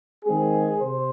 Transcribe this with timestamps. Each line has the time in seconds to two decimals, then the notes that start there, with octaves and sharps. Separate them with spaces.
0.25 D#3 G#3 C4 G#4
0.81 C3 C5